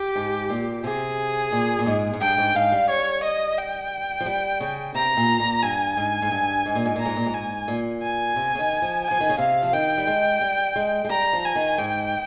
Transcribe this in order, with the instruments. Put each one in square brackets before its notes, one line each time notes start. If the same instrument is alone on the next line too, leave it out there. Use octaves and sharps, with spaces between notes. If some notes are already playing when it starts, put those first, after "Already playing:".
Already playing: [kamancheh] G4
[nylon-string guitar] G#2
A#2
[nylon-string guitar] C3 [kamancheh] G#4
[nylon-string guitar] A#2
A#2
G#2
G#2
[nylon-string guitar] G2 [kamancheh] G5
[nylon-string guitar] G#2
[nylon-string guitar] G#2 [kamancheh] F5
[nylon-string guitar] G3
[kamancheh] C#5
D#5
G5
[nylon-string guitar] F3
G3
C#3
[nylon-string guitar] C3 [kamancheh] A#5
[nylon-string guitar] A#2
A#2
[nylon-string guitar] G2 [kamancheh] G#5
[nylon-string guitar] G#2
G#2
G2
G#2
A#2
G#2
[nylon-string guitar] A#2 [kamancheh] A#5
[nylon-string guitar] G#2
A#2
G#2
[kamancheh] G#5
[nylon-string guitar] A#2
[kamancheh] G#5
[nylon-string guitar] C3
C#3
D#3
F3
[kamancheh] G#5
[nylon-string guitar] F3
D#3
C#3
[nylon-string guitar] C3 [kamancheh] F5
[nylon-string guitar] F3
[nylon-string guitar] D#3 [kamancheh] G5
[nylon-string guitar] G3
G#3
G3
G#3
G#3
[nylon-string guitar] G3 [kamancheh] A#5
[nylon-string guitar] F3
[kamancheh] G#5
[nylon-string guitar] D#3
[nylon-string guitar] G#2 [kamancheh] G5